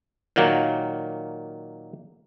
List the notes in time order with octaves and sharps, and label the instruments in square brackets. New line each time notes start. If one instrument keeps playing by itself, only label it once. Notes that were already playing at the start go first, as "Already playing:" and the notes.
[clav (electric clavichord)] A#2 D#3 F#3 A#3